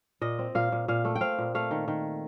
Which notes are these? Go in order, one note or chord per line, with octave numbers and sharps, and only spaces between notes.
A#2 D#5
C4
A#2 F5
A#2
A#2 F5
A3
G5
C4 F5
A#2
A3 F5
D#3
D#3